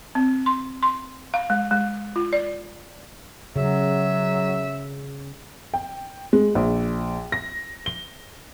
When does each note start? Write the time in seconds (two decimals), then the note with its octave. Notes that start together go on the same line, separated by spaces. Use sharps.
0.15 C4
0.46 C6
0.83 C6
1.34 F5
1.50 G#3
1.71 G#3
2.16 F4
2.33 D5
3.56 C#3 F#3 E5
5.74 G5
6.33 G#3
6.55 A#1
7.32 A#6
7.86 G7